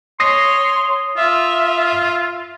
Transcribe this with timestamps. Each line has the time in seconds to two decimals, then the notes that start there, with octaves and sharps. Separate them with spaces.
0.20 C#5 C6 D#6 A#6 C7
1.17 F4 E5